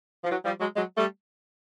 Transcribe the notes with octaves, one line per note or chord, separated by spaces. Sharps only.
F3
E3 F#3
F3 G3
F#3 G#3
F#3 G#3
G3 A3